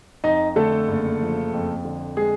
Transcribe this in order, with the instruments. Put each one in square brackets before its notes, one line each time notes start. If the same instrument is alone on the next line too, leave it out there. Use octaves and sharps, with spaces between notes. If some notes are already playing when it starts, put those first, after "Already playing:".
[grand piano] F2 D#4 D#5
D3 A3 A4
F#1
F3
F2
D3
G#3 G#4